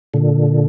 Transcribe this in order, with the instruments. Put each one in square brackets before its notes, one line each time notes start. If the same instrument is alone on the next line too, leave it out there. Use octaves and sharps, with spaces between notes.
[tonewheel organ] A#2 D3